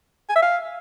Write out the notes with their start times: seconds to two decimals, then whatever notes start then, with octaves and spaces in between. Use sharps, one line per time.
0.29 G#5
0.36 E5
0.42 F5